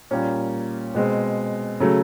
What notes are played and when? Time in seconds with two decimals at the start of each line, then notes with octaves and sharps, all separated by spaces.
0.11 A#2 G3 A#3 C#4
0.95 B2 G#3 C4
1.80 C#3 F#3 A3